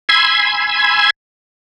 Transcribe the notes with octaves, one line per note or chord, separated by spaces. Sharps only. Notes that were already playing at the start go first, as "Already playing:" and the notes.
G#5 B5 C6 E6 G#6